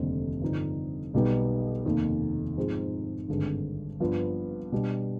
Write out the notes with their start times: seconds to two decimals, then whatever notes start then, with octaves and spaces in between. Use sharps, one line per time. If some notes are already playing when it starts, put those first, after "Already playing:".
Already playing: F1 D#2 D3 G3 C4
0.41 G2 D3 F3 C4 D#4
1.14 B1 B2 G3 B3 D#4
1.86 F1 D#2 D#3
2.57 G#2 F3 C4 D#4 G#4
3.28 G#1 G2 D3 G#3
4.00 G2 F3 B3 F4
4.72 B2 G3 D4